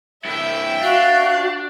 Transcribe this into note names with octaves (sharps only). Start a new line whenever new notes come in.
G2 E4 E5 G5
D4 F#4 F5